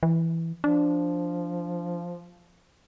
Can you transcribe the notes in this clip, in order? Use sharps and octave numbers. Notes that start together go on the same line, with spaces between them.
E3
F3 D4